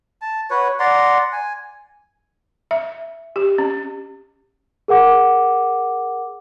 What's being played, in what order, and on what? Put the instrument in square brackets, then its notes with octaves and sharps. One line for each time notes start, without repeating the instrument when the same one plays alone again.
[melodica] A5
F#4 B4 C#5
D5 F#5 A#5 C6
G#5
[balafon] E5
G4
C#4
[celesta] G#4 A#4 F#5 D6